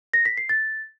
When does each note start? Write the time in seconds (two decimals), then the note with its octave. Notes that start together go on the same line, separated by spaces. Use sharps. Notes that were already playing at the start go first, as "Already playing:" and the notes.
0.14 A#6
0.25 B6
0.37 C7
0.49 A6